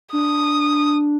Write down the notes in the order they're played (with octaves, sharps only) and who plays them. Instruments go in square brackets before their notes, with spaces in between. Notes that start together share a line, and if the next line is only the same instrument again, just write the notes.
[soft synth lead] D4 [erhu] D#6